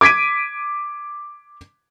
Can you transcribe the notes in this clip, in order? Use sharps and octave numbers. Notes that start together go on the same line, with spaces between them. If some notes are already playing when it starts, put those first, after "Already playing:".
D6 G#6 B6 D7 D#7